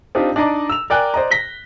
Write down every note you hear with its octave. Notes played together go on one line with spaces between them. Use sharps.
C4 D4 D#4 F4 G4
D4 D#4 D5 D#5 A#5 D6
E6 F7
A#4 D5 G5 G#5 F#6
C5 D5 D#5 A#5
A#6 B6 G7